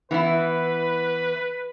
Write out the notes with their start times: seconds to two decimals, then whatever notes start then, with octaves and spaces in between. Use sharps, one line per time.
0.11 E3 B3 E4 B4